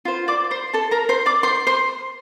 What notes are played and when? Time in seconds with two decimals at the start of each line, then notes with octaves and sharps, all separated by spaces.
0.05 F4 C5
0.28 D5 D6
0.51 C5 C6
0.73 A4 A5
0.91 A#4 A#5
1.09 C5 C6
1.26 D5 D6
1.43 C5 C6
1.67 C5 C6